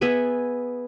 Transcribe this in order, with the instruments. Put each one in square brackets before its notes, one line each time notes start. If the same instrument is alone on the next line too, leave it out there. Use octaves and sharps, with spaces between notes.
[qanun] B3 G#4 E5 G#5